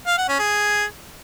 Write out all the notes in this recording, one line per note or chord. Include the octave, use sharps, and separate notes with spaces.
F5
F#5
C#4
G#4